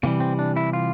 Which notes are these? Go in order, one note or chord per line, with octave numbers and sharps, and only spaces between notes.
C3 E3 G3 A#3
C4
D4
E4
F4